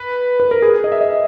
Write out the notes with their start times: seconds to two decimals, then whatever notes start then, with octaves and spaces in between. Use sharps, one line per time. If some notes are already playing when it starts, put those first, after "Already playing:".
Already playing: B4
0.40 B4
0.51 A#4
0.62 G#4
0.84 D#5
0.92 E5
1.01 D#5